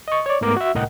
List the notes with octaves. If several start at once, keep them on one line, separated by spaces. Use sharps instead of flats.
D#5 C#6
C#5 D5
G#2 A3 B3 A#4 D6
F#4 E5
C2 A2 A#4 D#5 F#5 G5